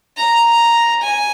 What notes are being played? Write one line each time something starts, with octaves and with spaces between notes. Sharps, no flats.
A#5
G#5